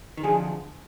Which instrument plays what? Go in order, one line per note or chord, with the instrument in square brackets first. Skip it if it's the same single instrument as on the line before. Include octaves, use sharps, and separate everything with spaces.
[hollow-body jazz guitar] D#3
[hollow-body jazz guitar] D3 F3 [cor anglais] G#4